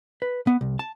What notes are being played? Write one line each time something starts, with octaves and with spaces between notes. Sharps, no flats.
B4
B3
C2
A5